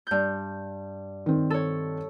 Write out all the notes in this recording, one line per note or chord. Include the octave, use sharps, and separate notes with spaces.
G2 G6
D#3 C4
A4 C#5